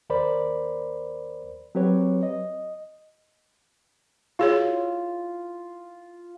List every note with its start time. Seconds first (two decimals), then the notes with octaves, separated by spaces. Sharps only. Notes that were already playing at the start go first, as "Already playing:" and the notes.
0.10 D#2 A#4 C5 D5 B5
1.75 F#3 C4 G4 B4 C#5
2.23 D#5
4.39 F4 F#4 G#4 C#5